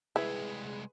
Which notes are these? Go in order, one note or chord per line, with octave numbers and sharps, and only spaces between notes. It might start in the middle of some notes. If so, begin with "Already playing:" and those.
C2 G#3 E4 G#4 B4